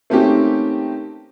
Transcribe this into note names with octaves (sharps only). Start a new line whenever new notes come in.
A3 A#3 C4 C#4 D#4 G4